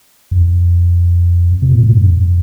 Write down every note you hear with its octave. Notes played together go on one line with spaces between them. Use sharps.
F2
C3
A#2
A2
G2
F2